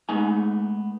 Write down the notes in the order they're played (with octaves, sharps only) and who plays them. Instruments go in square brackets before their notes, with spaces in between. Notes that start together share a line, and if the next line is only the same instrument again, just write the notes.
[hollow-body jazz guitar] G#3 A3 B3 D#4 G#5